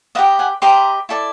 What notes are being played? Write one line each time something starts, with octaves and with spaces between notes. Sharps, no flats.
G4 B4 D#5 E5 F#5
F#5 G#5
G4 B4 D#5 A#5 C6
E4 A4 D5